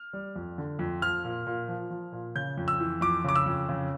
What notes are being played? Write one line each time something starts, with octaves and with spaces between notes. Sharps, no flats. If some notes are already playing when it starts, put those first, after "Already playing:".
Already playing: F6
G3
F2
D3
F2
F3 F6
A#2
A#2
F3
F3
A#2
C#3 G6
F2
E6
E3
F2 D6
C#3 D6
E6
F2
C#3